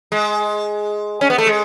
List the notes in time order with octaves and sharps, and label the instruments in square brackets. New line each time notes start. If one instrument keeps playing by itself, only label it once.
[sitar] G#3
C#4
B3
A3
G#3